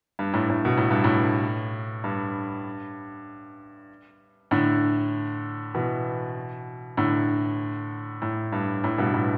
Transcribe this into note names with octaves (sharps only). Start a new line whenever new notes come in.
G2
A2
A2
B2
A2
G2
A2
G2
A2 D3
B2 E3
A2 D3
A2
G2
A2
G2 B2
A2